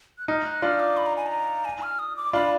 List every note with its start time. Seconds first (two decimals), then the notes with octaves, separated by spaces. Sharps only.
0.18 F#6
0.28 D#4 F6
0.46 F#6
0.62 D4 F4 F6
0.80 D6
0.97 B5
1.06 A#5
1.17 G#5
1.26 A#5
1.65 G#5
1.82 F6
1.99 D#6
2.17 D6
2.33 D4 F4 B5